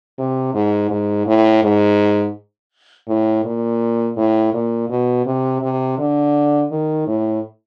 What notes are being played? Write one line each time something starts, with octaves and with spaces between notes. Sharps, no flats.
C3
G#2
G#2
A2
G#2
A2
A#2
A2
A#2
B2
C3
C3
D3
D#3
A2